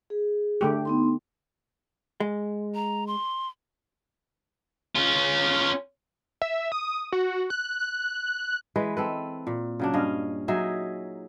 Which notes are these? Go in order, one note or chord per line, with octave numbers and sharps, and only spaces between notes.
G#4
D3 A3 G4
B3 D#4 C6
G#3
A#5
C6
C#4 F4
E5
D#6
F#4
F#6
F#6
E3 G#3 B4
C4 A4 B4
A#2
C#3 F#3 D4
G2 C#4 D#5 F5
F#3 D#4 G#4 E5